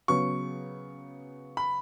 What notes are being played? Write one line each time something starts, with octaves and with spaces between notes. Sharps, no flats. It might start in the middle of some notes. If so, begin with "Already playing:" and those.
C#3 F#3 B3 C#6
B5